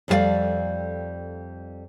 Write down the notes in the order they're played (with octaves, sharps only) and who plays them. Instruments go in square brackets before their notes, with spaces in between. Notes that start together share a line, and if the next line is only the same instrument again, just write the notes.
[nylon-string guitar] F2 G3 A3 E4 D5 F5